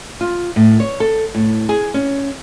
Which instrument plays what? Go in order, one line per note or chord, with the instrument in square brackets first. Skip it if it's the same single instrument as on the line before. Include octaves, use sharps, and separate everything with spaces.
[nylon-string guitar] F4
A2
C#5
A4
A2
G#4
C#4